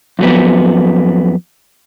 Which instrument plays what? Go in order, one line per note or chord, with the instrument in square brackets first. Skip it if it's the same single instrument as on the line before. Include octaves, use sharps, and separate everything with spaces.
[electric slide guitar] F2 F#3 B3